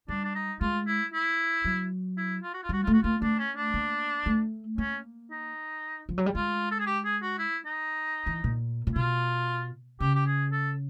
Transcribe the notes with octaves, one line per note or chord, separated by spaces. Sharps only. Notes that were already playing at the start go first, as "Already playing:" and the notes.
G3 D4
D4
D#4
G#3 F4
E4
E4
F#3
E4
F4
F#4
F4
G3 F#4
A3 F4
F#4
A#3 F4
A3 D4
C#4
D4
A#3
A3
A#3 C#4
D#4
F3
F#3
G3
G#3 F4
A4
G#4
G4
G#4
F#4
E4
D#4
E3
A#2
A#2
B2 F4
C#3 G4
G4
G#4
A4